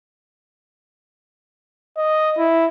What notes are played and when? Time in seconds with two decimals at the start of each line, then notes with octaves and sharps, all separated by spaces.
1.97 D#5
2.38 E4